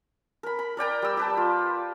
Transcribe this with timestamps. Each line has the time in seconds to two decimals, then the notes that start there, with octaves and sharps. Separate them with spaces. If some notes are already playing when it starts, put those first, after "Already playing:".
0.43 A#4 B5
0.59 B5
0.77 A#4 D5 G5 A#5
1.02 G3 E6
1.17 G4 B4 A5
1.37 F4